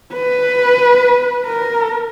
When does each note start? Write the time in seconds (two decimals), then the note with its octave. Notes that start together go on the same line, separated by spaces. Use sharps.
0.13 B4
1.46 A#4